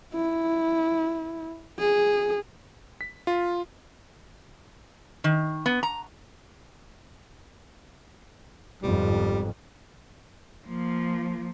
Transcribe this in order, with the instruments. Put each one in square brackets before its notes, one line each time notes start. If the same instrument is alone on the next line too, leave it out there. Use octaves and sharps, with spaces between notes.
[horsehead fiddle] E4
G#4
[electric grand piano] B6
F4
[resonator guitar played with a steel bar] D#3
B3
A#5
[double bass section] G1 F2 G#2 [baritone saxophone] G3
[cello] F3 A#3